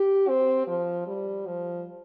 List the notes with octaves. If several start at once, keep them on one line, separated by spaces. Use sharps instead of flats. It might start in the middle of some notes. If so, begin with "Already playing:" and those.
Already playing: G4
C4
F3
G3
F3